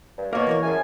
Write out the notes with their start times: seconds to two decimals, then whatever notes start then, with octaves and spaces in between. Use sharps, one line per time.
0.18 G2
0.33 B2 A#3 A#4 C#5
0.47 E3 A#4 C#5
0.63 F#2 C#3 F3 G#5